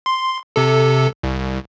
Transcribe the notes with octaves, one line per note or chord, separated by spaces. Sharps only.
C6
C3 A4
C2